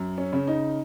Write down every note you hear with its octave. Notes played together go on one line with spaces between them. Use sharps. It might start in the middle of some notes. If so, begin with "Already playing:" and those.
Already playing: F#2
C#4
C#3
D#4